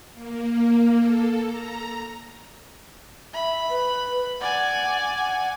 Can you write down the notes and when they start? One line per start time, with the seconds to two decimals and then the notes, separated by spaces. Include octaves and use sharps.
0.13 A#3
0.97 A4
1.44 A#5
3.34 E5 B5
3.70 B4
4.41 D5 F#5 G#5
5.17 F#5